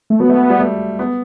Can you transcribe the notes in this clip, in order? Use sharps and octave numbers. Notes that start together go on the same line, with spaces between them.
A3
F#3 B3
A3
G3
A3
B3